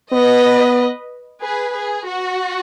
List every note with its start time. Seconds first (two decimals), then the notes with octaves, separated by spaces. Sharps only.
0.12 B3 B4 D#5
1.42 G#4 B4
1.74 G#4
2.07 F#4